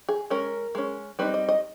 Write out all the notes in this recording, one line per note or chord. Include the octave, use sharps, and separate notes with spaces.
G#4
G#3 C#4 A#4
G#3 C#4
G3 C4 D#4 B4
D#5
D#5